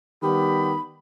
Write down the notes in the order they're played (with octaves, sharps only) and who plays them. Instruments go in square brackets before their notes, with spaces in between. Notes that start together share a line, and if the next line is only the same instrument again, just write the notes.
[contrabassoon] D#3 [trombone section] G3 B3 G4 [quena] B5